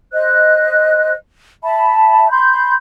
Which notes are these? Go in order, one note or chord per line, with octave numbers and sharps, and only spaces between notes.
C5 D#5 F#6
E5 A5 B5
B5 C6 G6